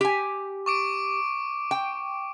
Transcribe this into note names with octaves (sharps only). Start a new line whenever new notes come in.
G4 G#5
C#6 D6 D7
G5